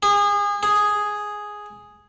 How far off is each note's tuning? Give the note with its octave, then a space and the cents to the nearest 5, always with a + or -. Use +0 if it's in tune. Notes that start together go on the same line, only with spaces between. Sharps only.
G#4 -30
G#4 +0